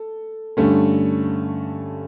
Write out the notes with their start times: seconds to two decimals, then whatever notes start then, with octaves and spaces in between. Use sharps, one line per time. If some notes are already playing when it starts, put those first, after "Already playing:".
Already playing: A4
0.57 G2 D3 A3 C#4